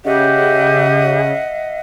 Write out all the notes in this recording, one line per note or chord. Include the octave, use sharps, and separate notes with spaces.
C#3 G4 D#5 E5 F#5